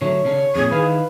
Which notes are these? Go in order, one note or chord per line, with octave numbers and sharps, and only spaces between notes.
D3 F#3 A3 C#5
C#3 C#4 D4
F2 A#2 G#4
D#3 E3 B4 F5